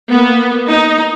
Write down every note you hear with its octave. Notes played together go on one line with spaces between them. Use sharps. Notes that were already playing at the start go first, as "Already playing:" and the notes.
A#3 B3
D#4